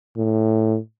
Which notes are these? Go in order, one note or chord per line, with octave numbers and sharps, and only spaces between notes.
A2